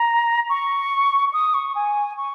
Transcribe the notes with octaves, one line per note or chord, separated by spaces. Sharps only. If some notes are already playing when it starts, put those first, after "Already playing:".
Already playing: A#5
C#6
D#6
C#6
G#5
C#6